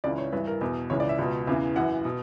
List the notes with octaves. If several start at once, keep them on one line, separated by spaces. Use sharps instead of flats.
C#2 C#3 E3 D5
C#5
G2 E3 B4
A#4
E2 B2
C#2 C#3 E3 C#5
D5
E5
C#2 B2
E2 C#3 E3
F#2 E3 F#5
B2